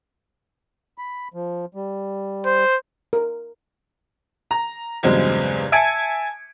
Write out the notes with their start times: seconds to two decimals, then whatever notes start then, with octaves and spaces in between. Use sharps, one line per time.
0.98 B5
1.34 F3
1.75 G3
2.46 C5
3.13 A#4
4.51 A#5
5.03 E2 G2 C#3 F#3 G#3 C4
5.72 E5 G#5 A5 G#6 C#7 D7